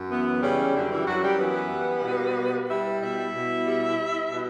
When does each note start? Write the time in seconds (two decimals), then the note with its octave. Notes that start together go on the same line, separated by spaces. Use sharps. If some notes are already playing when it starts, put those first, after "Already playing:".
Already playing: F#2
0.09 E3 B3
0.42 C#3 G3 C#4
0.74 F#2 D3 D4
0.90 E3 E4
1.07 F#2 F#3 F#4
1.23 G3 G4
1.39 E3 B3 B4
1.72 G3
2.03 B2
2.36 G3
2.68 G3 E4 E5
3.01 B2 E4 E5
3.33 B2
3.66 G3
3.98 G3
4.30 B2